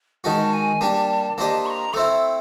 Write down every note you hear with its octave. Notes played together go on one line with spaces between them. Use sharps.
D#3 G#3 C#4 F#4 A5
G#5
G3 A#3 D4 G4 A5
A#3 D4 G4 C5 D#5 A5
C#6
A#5
A3 C4 E4 E6